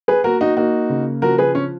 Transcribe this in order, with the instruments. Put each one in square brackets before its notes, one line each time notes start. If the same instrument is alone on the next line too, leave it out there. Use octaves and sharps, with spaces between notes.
[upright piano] G#4 B4
A#3 F#4 A#4
D#4 F#4
A#3 D#4 F#4
C#3
F3 F#4 A#4
G#4 B4
C#4